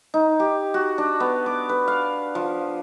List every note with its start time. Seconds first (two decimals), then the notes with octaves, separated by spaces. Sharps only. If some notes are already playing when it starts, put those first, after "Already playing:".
0.14 D#4
0.40 G4
0.74 F#4
0.98 D4
1.20 B3
1.46 D6
1.69 B4
1.88 F5
2.35 F3